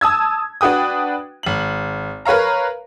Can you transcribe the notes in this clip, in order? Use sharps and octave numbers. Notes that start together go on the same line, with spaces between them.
A5 D#6 E6 G#6
D4 F#4 B4 G5 D#6
G#1 F#7
A#4 B4 C#5 F5 A#5